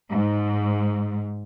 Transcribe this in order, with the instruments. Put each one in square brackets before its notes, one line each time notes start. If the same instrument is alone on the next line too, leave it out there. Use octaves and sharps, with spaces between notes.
[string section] G#2